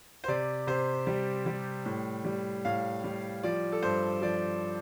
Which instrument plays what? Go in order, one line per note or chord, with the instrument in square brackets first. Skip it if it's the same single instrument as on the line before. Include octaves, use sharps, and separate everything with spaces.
[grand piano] C5
C3 D5
C3 C5
G3
G3
A2
G3
A2 F5
G3
F3 D5
A4
G2 C5
F3 D5